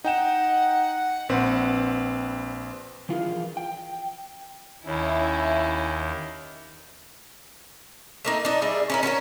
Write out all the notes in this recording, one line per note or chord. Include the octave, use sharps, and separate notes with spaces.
D#4 F#5 G5 E7
A#1 C4 B4
E3 F3 F4 G#4 A#4
G5
D#2 C#4 E4
A3 A#3 D#4
D4 D#4
G3 G#4 E5
C#4 E4 A#4
C#4 F#4 A4 A#4